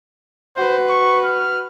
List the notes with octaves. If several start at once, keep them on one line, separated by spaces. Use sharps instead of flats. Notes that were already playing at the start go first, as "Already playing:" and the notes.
F#4 B4 C5
C#6
F6